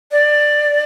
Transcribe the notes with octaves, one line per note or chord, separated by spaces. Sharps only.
D5